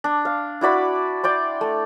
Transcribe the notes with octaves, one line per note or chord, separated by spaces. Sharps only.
D4
F5
E4 F#4 D5 B5
D5 G5 C6
A3